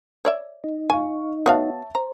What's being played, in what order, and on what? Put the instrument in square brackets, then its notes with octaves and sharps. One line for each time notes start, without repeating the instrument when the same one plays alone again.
[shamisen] C#5 D5 E5
[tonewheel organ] D#4
[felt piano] F5 C#6 [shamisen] G#5
[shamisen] B3 F#4 F5 [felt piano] C#5 E5 A5
[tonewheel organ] C5 [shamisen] A#5